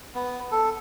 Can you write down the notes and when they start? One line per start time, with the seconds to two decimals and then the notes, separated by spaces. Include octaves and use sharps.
0.15 B3
0.52 A4